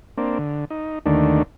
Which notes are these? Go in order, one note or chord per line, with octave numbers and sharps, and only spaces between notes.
A#3 C4 D4
D3
D#4
D#2 D3 D#3 A3 D4